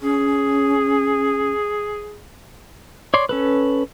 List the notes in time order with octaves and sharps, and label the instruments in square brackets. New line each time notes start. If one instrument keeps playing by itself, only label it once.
[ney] C#4 [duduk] G#4
[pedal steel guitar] C#5 D5 C6
C#4 A4 B4